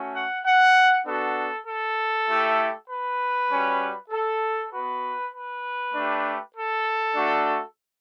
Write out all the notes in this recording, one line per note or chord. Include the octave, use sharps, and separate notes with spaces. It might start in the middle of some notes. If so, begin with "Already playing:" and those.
Already playing: A3 C#4 F#4
F#5
F#5
B3 D4 F#4 A4
A4
A3 E4 G4
B4
G3 C#4 F#4
A4
B3 F#4 B4
B4
A3 D4 G4
A4
A3 D4 F#4